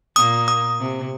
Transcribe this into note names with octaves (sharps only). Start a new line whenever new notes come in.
A#2 A#3 D#6
D#6
C3